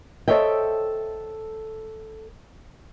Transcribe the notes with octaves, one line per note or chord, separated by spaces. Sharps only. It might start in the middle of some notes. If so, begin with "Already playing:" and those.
A4 C5 C#5 D#5 E5 G5